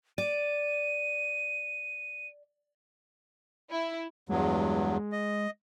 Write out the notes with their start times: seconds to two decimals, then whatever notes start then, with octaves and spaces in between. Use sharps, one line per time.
0.18 D5 D#7
3.70 E4
4.29 E2 G2 F#3 G#3
5.12 D#5